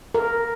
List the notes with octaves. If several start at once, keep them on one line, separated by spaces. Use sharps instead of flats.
A#4